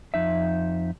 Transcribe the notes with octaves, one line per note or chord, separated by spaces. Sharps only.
F2 D#4 E5